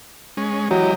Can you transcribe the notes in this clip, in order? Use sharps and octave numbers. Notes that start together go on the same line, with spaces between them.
G#3 C#4
E3 F#3 G4 D#5